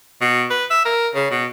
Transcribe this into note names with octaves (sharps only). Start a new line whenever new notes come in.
B2
B4
E5
A#4
C#3
B2